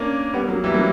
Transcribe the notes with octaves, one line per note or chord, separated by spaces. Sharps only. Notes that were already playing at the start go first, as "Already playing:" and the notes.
Already playing: A#3 C#4 D4
G3 B3
F#3 A#3
E3 G3
F#3 A#3